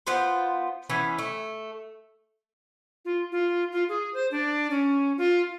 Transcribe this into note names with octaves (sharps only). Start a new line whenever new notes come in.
B3 F4 C5
E3 B3 C#4
A3
F4
F4
F4
G#4
C5
D4
C#4
F4